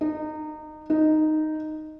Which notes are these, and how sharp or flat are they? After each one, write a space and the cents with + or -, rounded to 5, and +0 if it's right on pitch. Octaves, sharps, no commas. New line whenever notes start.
D#4 -25
D#4 -5